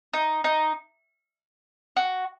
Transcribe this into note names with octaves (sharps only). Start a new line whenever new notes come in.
D#4
D#4
F#4